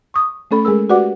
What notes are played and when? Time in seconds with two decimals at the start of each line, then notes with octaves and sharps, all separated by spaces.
0.14 C#6 D#6
0.51 A3 C#4 A4 B5
0.65 G#3 G#4 A#4 E6
0.90 F#4 G4 B4 D5 F#5 D6